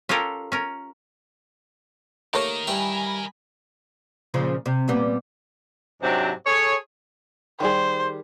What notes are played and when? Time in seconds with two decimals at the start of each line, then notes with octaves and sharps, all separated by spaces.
0.09 C#4 F4 G4 A4 A#4
0.52 C#4 A#4
2.34 A3 A#3 D#4 G4 A#4 C#5 D#5
2.67 G2 E4 G5 G#5 B5
4.34 A#2 C#3 F3
4.66 C3
4.88 A#2 G3 B3
6.02 G#2 C3 F#3 C4 D4
6.46 G#4 A4 C#5
7.60 D#3 G3 G#4 C5